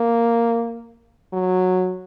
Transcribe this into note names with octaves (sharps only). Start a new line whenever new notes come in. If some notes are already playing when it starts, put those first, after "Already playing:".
Already playing: A#3
F#3